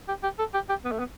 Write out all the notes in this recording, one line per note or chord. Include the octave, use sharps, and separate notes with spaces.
G4
G4
A4
G4
G4
B3
A3
B3